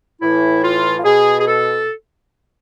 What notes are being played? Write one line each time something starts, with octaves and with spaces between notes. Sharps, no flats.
A2 E3 E4
F4
F4
B2 G#4
G#4
A4